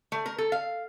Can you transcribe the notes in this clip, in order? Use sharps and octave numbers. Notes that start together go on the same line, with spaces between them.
A3
A#4
A4
F5